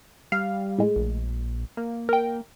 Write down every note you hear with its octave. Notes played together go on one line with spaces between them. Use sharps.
G3 F5
A2 G#3
A#1
A#3
A#4 G5